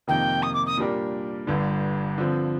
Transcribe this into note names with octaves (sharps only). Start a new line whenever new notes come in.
F2 C3 D#3 A#3 D#4 G5
D#6
D6
D#6
A#2 G3 D4 G4 A#4
G1 G2 D3
D3 F3 C4